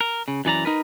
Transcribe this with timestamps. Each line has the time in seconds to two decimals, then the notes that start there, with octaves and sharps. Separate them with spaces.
0.01 A#4
0.28 C#3
0.45 F#2 E3 D5 A#5
0.65 D#4 A#4 B4